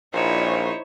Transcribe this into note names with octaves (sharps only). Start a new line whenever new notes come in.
A#1 A#2 D#4 E4 C5 C#5